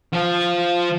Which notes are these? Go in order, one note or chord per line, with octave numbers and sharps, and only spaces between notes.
F3